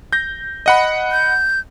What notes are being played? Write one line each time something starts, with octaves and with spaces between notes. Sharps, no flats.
G6 A#6
D#5 F#5 B5
G6